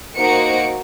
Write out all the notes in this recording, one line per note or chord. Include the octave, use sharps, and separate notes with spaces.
A#3 D#4 F#4 C5 C#7 D7